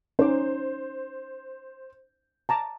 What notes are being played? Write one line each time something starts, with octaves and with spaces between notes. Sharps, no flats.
C#4 D#4 C5 D6
A5 A#5 D6